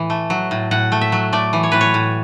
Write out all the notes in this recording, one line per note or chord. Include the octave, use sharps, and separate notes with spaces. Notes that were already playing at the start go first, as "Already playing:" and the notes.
Already playing: A2 E3
A3
F#3
A2
A2 F#5
A3
E5
F#3
A3 D5
E3
C#5
A2 B4
C#5
A2